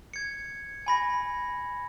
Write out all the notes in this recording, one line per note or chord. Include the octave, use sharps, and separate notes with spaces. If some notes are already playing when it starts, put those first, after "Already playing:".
G#6 C#7
G#5 B5 A#6